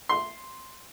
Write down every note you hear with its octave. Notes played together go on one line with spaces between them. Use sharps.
C6